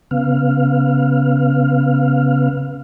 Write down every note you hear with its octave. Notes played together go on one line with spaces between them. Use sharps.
C#3 B3 F5